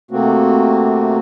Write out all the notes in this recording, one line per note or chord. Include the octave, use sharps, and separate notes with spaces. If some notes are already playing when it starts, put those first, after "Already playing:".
C3 A3 A#3 C4 F#4